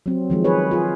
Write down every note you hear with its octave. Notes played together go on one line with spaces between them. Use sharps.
F#3 C4
D#3 F3 G#3
G#4 B4 C#5
F4 G#4